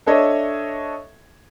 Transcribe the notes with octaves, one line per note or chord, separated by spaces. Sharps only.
D4 A4 C#5 D#5 E5